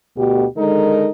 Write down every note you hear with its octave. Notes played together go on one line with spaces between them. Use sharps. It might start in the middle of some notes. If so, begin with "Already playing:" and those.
D2 B2 G4
D3 D#3 G#3 D#4 A4 A#4